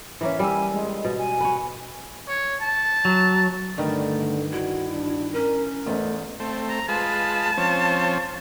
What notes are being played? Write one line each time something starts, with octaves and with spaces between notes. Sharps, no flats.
E3 A#3 C#4 E5
G3 E5 G#5
G#3
B2
G#5
B4 C#5
C#5
A5
F#3
G2 D3 D#3 A3
E4 F#4
D4
C#4 A#4
E2 G#2 A3
A3 C4
A#5
G#3 F4 B4 A5
F3 C4 C#4